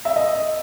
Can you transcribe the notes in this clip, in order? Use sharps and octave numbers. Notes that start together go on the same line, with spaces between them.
E5
D#5